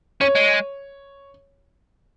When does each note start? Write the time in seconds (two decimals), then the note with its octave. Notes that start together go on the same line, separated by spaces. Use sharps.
0.21 C#4 C#5
0.35 G#3